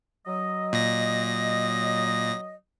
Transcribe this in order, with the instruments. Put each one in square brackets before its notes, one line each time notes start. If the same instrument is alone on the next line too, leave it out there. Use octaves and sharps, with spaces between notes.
[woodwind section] F#3 D#5
[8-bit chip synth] A#2 A#6